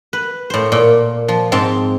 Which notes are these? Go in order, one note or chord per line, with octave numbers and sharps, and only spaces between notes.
B4
A2 C5
A#2
F3
G#2 C4 A5